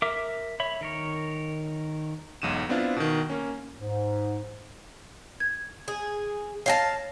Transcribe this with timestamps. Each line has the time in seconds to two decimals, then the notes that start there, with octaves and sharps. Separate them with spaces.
0.02 A#4 E5 D6
0.60 C#5 E5 B5
0.81 D#3 A#4 C#5
2.42 B1 E2 G#2 D#7 E7
2.69 B3 C4 D4 E4 F4
2.96 B2 D#3
3.30 A#3 C#4
3.80 G#2
5.40 G#6
5.88 G#4
6.66 C#5 F5 G5 A5 A#6